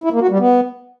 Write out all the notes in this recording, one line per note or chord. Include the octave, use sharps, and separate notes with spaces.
E4
A#3
F#4
G3
B3